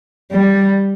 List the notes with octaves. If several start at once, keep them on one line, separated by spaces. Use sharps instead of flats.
G3